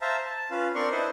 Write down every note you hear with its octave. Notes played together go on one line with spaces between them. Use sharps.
C5 E5 F5 A5 A#5
A5
C#4 F4 B4 F5
C4 D4 A#4 D5 C6 C#6
D4 E4 B4 C5 D#5